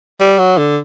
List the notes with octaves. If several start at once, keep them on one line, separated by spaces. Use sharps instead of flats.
G3
F#3
D3